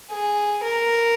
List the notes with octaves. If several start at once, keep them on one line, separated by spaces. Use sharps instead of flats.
G#4
A#4